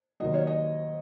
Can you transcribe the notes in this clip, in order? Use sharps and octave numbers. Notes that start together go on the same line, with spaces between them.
D#2 D#3 F#3 D#5
C#5
D#5